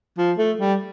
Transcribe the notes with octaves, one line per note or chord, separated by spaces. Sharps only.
F3
A3
G3